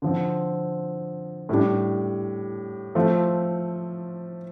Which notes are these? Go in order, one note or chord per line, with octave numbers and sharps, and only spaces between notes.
D3 F3 C4
A2 G3 D4
F3 A3 C4 F4